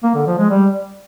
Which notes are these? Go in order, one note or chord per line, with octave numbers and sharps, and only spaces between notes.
A#3
D3
F3
G#3
G3